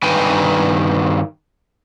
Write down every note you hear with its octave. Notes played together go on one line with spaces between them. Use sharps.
G2 D#3 B4 G5 G#5